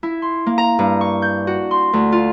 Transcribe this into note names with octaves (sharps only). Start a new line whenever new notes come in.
E4
C6
A#3
A#5
G2
C#6
G6
F#4
C6
D2
F4